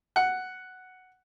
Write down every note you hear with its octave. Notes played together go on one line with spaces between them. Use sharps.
F#5